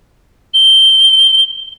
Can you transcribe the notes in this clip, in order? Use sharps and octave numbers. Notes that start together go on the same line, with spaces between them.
G7